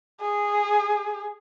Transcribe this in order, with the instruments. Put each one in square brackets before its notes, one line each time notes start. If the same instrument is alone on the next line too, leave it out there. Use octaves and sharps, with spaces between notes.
[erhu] G#4